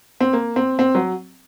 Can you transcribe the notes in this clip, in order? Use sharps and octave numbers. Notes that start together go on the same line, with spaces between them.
C4
A#3
C4
C4
F#3